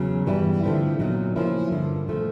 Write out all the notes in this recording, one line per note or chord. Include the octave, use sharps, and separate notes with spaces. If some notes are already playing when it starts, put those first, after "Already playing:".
Already playing: E2 C#3 F#3
G2 E3 G3 B3 E4
D3 F3 A3 C4 E4
A#2 F#3 B3 D#4
C#3 F3 A#3 C#4 E4
G2 D3 F3
A#2 F3 A3